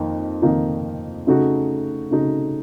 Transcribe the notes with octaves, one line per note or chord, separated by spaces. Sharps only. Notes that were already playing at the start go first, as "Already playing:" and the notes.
Already playing: F2 D#3 A#3 D#4
F2 D#3 A#3 D#4
C#3 A3 D#4 F#4
C#3 A3 D#4 F#4